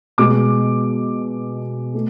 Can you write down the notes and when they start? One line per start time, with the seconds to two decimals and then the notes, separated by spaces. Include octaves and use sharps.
0.18 B2 G#3 B3 D6
1.94 A3